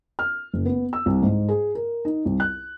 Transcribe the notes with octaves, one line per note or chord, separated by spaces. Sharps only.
F6
F#1
B3
E6
C2
G#2
G#4
A#4
D#4
C2
F#6